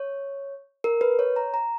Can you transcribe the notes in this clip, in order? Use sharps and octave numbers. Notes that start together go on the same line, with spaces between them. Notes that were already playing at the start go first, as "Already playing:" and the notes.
Already playing: C#5
A#4
B4
C#5
A#5
A#5